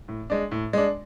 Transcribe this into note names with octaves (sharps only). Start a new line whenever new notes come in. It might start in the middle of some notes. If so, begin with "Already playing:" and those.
A2
G#3 D4
A2
G#3 D4